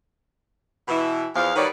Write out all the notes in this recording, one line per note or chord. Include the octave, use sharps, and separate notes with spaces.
B2 E3 E4
E2 F3 F5
D#3 G3 F#4 B4 C#5 D5